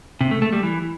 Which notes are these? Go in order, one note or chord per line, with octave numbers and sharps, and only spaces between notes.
C3
A3
A3
G3
E3